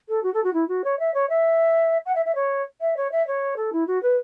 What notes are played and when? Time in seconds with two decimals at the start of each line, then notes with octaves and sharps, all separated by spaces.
0.08 A4
0.23 F#4
0.34 A4
0.44 F#4
0.53 E4
0.68 F#4
0.84 C#5
0.99 E5
1.14 C#5
1.29 E5
2.06 F#5
2.15 E5
2.25 E5
2.35 C#5
2.81 E5
2.96 C#5
3.11 E5
3.27 C#5
3.56 A4
3.72 E4
3.87 F#4
4.02 B4